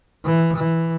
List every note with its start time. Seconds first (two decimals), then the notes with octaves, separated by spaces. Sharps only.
0.25 E3
0.57 E3